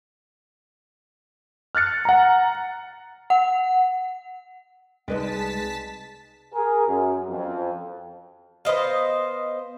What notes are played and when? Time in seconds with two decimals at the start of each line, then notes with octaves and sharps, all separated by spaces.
1.75 F6 F#6 A6 C#7
2.05 F#5 A#5
3.30 F#5
5.08 C2 G#3 D#4 B4 D5 A5 B6
6.54 G#4 A#4
6.87 F#2
7.29 F2
8.65 B3 C5 D#5 F5